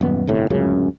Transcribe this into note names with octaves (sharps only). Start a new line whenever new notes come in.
D#1 F#2 B3
G1 C2 A2
D1 C#2 F#2 C#3